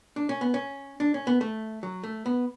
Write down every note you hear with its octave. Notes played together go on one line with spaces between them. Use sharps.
D4
C#4
B3
C#4
D4
C#4
B3
A3
F#3
A3
B3